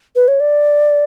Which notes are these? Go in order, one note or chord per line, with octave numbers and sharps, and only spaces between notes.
B4
C#5
D5